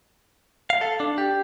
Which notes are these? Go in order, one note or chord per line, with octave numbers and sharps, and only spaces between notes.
F5
A4
D4
G4